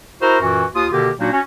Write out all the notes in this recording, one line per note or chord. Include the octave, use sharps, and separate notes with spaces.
E4 F#4 A#4 C5 A#5
F#2 A#2 E3 F#4
D#2 F4 D#6
B2 D3 D#3 A#3 G4
A#2 F#3 A#3 D4 D#4 F#4
C#4 F#4